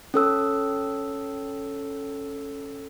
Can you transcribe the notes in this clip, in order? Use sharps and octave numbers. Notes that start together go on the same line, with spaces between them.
C#4 A4 E6